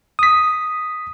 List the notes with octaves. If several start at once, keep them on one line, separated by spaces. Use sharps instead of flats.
D#6 B6